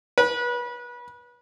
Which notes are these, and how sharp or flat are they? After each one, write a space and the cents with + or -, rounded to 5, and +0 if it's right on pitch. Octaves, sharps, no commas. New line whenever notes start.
B4 -30